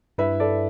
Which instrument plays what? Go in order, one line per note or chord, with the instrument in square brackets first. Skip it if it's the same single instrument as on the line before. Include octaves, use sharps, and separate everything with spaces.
[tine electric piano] G2 G3 E4 [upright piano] B4 E5
[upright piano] A4 D5